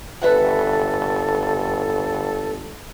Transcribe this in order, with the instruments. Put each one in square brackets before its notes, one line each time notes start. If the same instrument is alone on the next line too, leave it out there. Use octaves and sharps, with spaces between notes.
[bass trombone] G1 [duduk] A4 [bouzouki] B4 E5 F#5